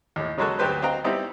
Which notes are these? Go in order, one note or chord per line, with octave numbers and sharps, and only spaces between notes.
D#2 A2
C#3 F#3 G#3 C#4 F#4 A4
D2 F#3 F#4 G4 B4 C5
C4 F#4 D#5 F5 G5 A#5
G3 B3 C4 D#4 E4 G4